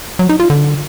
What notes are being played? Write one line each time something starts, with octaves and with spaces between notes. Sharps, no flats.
F#3
D#4
F4
D3